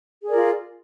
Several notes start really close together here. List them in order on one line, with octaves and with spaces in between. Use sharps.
G#4 D5 A#4 F4